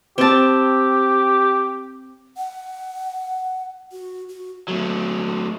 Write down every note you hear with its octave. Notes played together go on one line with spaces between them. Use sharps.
C4 G4 A5
F#5
F#4
F#4
F#3 A3